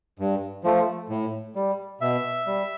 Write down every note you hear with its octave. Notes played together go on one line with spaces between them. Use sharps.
G2
F3 A3
A2
G3
B2 E5
G3